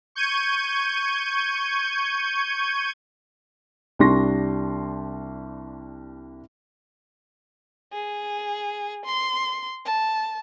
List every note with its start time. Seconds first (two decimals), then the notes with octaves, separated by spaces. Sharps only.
0.15 C#6 G6 G#6 D#7
3.99 C2 G3 D4 C6 C#6 A#6
7.93 G#4
9.05 C6
9.86 A5